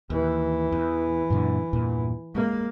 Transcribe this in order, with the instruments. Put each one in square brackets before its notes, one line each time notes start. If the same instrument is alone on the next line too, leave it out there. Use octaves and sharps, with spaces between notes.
[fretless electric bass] D#2 [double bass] E3
[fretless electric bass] E2
F#2 A#2 D3
E2 G2 A#2
[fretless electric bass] G#3 [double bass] A#3